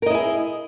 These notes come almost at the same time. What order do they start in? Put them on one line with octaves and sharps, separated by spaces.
A#4 D#5 E4 G#4